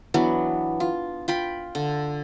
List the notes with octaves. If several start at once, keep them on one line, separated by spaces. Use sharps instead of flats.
E3 F#3 B3 D4
F4
F4 G5 B5
D3